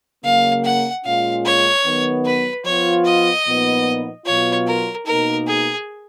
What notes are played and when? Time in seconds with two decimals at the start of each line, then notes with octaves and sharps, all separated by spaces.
0.24 C#3 F#3 A#3 F5
0.65 F#5
1.05 A#2 G#3 C#4 F4 F5
1.45 C#5
1.85 D#3 F#3 B3
2.25 B4
2.65 F3 B3 F4 C#5
3.05 D#5
3.46 A#2 F3 B3 D#4
4.26 B2 F#3 B3 F4 C#5
4.67 A#4
5.06 B2 A#3 D#4 A#4
5.47 G#4